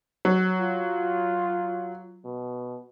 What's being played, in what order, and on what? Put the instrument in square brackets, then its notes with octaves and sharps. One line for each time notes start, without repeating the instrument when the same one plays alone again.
[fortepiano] F#3
[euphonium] F4
B2